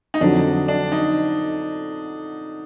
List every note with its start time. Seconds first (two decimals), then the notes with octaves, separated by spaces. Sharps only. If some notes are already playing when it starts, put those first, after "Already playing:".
0.14 D#4
0.21 F2 D3 F#3 D4
0.68 D4
0.92 D#4